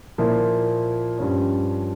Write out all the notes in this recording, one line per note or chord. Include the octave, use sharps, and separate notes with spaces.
A#2 F3 A#3 E4
G2 F3 C#4